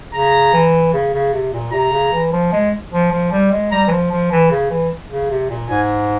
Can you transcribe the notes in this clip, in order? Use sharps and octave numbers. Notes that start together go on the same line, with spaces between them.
C#3 A#5
E3
C#3
C#3
C3
A#2
C3 A#5
C#3
E3
F3
G#3
F3
F3
G3
G#3
G3 A#5
E3
F3
F3
E3
C#3
E3
C#3
C3
A#2
G#2 G#5